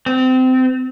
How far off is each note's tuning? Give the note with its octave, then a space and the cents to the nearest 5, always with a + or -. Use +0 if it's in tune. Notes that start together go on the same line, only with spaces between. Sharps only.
C4 -25